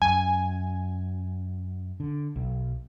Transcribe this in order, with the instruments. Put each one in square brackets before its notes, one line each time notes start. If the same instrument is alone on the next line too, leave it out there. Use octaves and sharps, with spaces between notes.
[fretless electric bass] F#2 [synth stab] G#5
[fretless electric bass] D3
B1